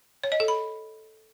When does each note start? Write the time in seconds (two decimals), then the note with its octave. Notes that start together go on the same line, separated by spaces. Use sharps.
0.24 C#5
0.32 D#5
0.40 A4
0.48 B5